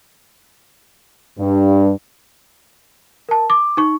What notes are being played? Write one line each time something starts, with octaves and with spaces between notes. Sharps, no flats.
G2
A#4 A5
D6
D#4 C#6